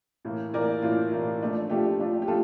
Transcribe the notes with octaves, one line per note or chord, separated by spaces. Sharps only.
A2 E3 A#3
A2 E3 A#3 A#4 D5
A2 E3 A#3 F4
A2 E3 A#3
F3 A3 D4 F4
F3 A3 D4 F4 G4
F3 A3 D4 F4
G4
F3 A3 F4 A4